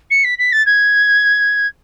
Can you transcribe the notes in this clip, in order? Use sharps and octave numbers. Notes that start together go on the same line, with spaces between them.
C#7
B6
B6
A6
G#6